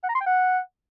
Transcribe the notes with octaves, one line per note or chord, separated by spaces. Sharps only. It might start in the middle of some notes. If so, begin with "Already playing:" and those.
F#5
A#5
C6
G5
F#5